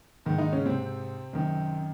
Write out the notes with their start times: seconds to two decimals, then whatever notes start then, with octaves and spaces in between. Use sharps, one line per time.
0.26 G#2 D#3
0.38 D#3 D#4
0.52 C#3 C#4
0.66 C3 C4
1.33 F#2 D#3